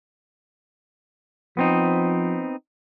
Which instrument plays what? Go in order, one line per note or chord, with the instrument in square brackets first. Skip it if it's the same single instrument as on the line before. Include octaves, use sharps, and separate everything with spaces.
[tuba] F3 [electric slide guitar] B3 C4 D#4